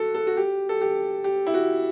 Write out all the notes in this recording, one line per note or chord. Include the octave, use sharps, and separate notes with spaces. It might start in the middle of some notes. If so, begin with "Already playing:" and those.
Already playing: F#4 A4
A4
F#4
G4
A4
G4
G4
E4
F#4